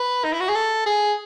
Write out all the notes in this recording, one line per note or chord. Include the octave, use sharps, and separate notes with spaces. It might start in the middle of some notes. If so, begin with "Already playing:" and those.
Already playing: B4
D#4
E4
F#4
G#4
A4
G#4